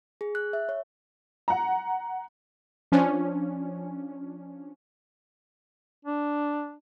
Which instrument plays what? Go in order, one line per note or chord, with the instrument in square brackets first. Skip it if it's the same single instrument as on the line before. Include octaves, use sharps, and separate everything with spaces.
[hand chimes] G#4
F#6
E5
C#5
[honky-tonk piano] F#5 A#5
[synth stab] F3 C#4 D4
[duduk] D4